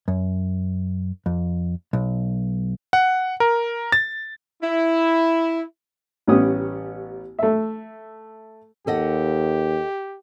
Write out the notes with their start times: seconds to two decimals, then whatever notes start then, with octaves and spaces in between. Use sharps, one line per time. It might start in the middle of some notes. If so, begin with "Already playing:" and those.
0.08 F#2
1.26 F2
1.93 B1
2.93 F#5
3.40 A#4
3.92 A6
4.62 E4
6.27 A1 G3 B3 C#4 G4 D#6
7.39 A3 E5
8.87 D#2 G4 A4 D#5 F#5